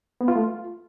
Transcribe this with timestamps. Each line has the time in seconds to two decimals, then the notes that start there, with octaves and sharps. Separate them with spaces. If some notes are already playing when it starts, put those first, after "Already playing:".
0.21 B3
0.28 F4
0.36 A3
0.43 F4